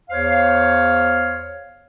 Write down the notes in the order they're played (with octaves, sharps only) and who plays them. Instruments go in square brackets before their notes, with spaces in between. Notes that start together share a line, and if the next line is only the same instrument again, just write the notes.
[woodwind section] E2 C5 C#5 F5